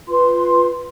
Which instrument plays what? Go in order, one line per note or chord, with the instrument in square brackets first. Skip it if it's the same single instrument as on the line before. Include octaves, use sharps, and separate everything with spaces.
[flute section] F4 B4 C6